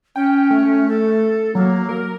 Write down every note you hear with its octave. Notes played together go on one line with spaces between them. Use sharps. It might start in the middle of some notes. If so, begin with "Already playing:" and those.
C#4 G5
A3
A4
F#3 A#3
A#4